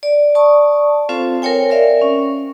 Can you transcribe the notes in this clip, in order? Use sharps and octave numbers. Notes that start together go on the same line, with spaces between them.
D5
D5 A5 C#6 D#6
C4 F4 A4 C5 F5
A#4 C5 C#5 G5 G#5
A#4 D5 E5 F5
C#4